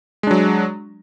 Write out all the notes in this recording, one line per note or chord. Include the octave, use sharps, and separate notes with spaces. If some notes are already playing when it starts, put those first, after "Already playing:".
F#3 G#3 D4